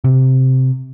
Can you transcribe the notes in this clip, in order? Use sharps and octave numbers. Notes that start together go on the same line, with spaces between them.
C3